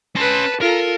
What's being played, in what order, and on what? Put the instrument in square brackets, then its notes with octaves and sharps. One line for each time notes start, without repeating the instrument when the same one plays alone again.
[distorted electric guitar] C#4 C6 [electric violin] B4 A5
[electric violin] F4 A4 [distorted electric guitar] A#4